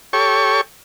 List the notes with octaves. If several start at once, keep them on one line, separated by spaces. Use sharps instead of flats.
G4 A4 C#5 C#6